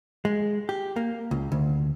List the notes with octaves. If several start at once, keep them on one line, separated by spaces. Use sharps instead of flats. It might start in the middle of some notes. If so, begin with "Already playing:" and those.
G#3
G4
A#3
C#2
D2